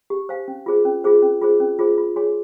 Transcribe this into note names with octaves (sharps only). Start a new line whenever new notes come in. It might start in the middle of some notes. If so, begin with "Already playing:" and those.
G4
C5 F5 G#5
C#4
F4 G#4 C5
C#4
F4 G#4 C5
C#4
F4 G#4 C5
C#4
F4 G#4 C5
F4
G#4 C#5 G#5 C6